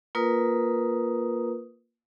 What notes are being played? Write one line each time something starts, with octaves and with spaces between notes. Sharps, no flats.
A#3 F4 A#4 B4 D#6